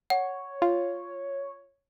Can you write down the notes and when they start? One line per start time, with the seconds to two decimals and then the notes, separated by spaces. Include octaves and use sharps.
0.10 C#5 F#5
0.62 F4